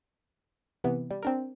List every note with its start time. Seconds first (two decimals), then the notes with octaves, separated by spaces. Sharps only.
0.84 C3 E3 B3
1.11 G3
1.23 C4 D4 A#4